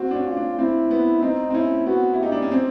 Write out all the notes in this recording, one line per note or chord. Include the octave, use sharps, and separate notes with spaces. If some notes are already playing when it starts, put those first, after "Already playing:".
Already playing: C4 F#4
D4
C#4
F4
D4
C4 E4
B3
C4 D#4
C4
C#4 E4
B3 F#4
E4
D#4 G4
D4
C#4
C4